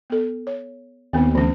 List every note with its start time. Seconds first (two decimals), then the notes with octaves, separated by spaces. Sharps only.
0.10 B3 A4
0.47 C#5
1.13 D#2 D#3 B3 C4
1.35 D2 E3 C#4